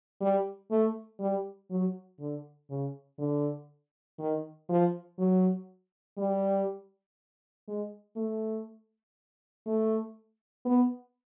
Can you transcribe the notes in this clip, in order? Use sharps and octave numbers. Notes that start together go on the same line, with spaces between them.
G3
A3
G3
F#3
D3
C#3
D3
D#3
F3
F#3
G3
G#3
A3
A3
B3